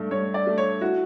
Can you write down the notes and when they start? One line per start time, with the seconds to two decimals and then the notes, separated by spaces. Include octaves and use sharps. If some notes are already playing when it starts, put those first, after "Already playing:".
Already playing: G2 A3
0.11 G2 C#5
0.34 D5
0.47 A3
0.58 C#5
0.81 E4 F#4